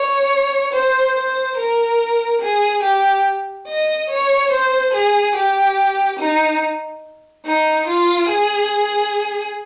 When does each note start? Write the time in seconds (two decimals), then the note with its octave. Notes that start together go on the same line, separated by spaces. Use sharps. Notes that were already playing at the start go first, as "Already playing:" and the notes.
Already playing: C#5
0.73 C5
1.15 C5
1.57 A#4
2.41 G#4
2.83 G4
3.68 D#5
4.09 C#5
4.51 C5
4.93 G#4
5.35 G4
6.19 D#4
7.45 D#4
7.87 F4
8.30 G#4